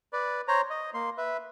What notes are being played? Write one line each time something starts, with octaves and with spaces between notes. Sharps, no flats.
B4 D5
C5 C#5 A#5
D#5
A#3 C6
B4 E5